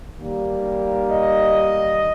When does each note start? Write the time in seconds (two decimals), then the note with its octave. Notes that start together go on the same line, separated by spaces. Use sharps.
0.17 D#3 G3 A#3
1.11 D#5